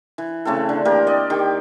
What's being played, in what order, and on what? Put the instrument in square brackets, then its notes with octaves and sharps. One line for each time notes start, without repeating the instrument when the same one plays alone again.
[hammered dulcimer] E3
C#3 A3 C4 A4
D3
E3 A#3 G4 A#4
D5 D#5
D#3 G4